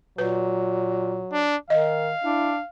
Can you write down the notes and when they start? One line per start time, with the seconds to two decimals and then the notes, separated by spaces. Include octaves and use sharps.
0.18 A#2 F#3 B4
1.32 D4
1.70 D#3 D#5 F5
2.24 D4 E4